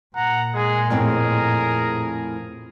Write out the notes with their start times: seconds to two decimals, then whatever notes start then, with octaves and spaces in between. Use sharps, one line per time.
0.16 A#2 F#5 A#5
0.54 G#3 G#4
0.90 F2 A2 C4 G#4 A#4